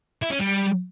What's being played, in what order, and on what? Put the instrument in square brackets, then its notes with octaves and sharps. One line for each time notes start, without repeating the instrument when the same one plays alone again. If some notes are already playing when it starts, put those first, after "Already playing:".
[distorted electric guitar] E4
C#4
G3